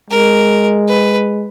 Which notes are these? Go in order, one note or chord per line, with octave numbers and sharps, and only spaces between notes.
G#3 A#4
B4